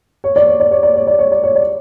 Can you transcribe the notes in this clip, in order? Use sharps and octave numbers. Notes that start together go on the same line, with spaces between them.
C#5
D5
C#5
D5
C#5
D5
C#5
D5
C#5
D5
C#5
D5